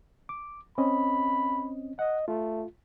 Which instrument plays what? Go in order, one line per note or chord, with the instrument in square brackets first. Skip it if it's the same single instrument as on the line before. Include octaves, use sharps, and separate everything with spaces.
[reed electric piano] D6
[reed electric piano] C4 C#4 D#5 [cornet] B5
[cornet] D#5 [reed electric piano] F#5
[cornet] A3 [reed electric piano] F4